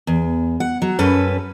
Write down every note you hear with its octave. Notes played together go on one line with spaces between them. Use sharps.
E2
F#5
F#3
F#2 C#4 A4 B4